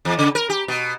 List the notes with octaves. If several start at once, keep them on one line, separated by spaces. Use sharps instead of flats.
E2
C#3
A#4
G4
B2